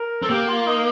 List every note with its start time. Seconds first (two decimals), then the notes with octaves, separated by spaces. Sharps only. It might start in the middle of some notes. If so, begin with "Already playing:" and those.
Already playing: A#4
0.22 C4 A4
0.30 A#3 G4
0.49 F4
0.67 D#4